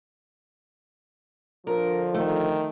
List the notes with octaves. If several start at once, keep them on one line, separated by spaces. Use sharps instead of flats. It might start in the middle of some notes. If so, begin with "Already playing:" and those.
D3 F3 A#4
D#3 A3